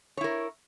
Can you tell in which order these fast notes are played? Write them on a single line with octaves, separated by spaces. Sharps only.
C#5 E4 A#4